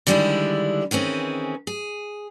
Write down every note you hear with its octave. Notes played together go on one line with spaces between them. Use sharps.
D3 D#3 G3 G#3 D4 E4
D#3 E3 C4 C#4 G#4
G#4